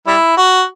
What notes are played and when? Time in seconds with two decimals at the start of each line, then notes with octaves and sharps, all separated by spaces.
0.07 G3 E4
0.37 F#4